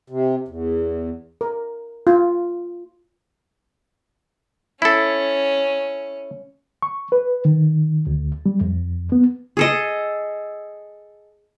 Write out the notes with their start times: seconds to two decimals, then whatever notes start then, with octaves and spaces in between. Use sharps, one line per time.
0.10 C3
0.48 E2
1.41 A#4
2.07 F4
4.82 C#4 E4 A4
6.82 C#6
7.12 B4
7.45 D#3
8.07 D2
8.46 G3
8.61 F2
9.12 B3
9.57 G#4 A4 D#5